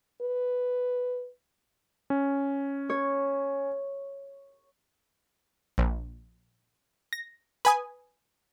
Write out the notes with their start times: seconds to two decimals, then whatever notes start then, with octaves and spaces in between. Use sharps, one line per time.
0.21 B4
2.10 C#4
2.90 C#5
5.78 A#1
7.13 A#6
7.65 B4 G#5 D#6